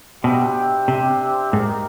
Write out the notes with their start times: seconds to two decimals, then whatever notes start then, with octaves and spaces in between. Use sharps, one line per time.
0.23 B2 D4 G4 C5 E5 G5
0.88 C3
1.52 G#2 A#3 D#4 G4 A#4